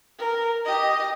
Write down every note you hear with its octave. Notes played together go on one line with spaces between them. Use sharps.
A#4
G4 D#5